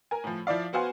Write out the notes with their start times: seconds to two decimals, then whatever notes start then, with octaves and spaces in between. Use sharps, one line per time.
0.11 A#4 G#5
0.24 A2 F3
0.47 F3 E4 D5 F5
0.73 B3 F#4 C5 F5 G#5